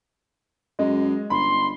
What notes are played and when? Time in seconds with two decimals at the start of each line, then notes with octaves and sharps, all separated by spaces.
0.79 F#2 G#3 D#5
1.30 G1 B5 C6